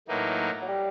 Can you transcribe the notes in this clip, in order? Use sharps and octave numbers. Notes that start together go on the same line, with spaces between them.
A2 E3 F#3 A#3 D#4
F#3
G3